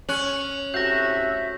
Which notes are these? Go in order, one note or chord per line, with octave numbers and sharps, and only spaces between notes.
C#4 C#6 F#6 F#7
A2 C3 F#4 E5 G6 A#6